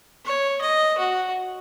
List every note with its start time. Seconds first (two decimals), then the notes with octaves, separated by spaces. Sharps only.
0.25 C#5
0.61 D#5
0.98 F#4